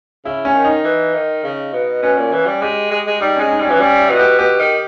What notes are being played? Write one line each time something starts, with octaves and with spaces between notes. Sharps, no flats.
C#3 E4
C#4
D#3
D#4
E3
D#3
C#3
B2
B2 C#4
A#2
E3
G3
G#3 G4
G#3
G#3
G3 D#4
G#3 C#4
D#4
G3 C#4
E3
G3 C#4
E4
B2
G4
B2 G4
D#3